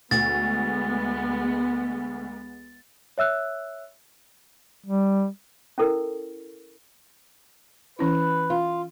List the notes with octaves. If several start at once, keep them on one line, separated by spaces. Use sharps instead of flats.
D2 G#3 B3 A6
C#5 E5 E6 F#6
G3
C#4 E4 A4 A#4
E3 C#4 E4 B4
F4